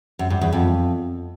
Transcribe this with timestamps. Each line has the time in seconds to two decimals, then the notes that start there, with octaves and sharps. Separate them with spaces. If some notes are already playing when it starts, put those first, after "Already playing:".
0.19 F#2
0.30 G2
0.41 E2
0.53 F2